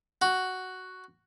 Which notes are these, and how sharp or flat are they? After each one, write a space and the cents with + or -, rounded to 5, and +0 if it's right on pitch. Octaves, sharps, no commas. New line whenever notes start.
F#4 +5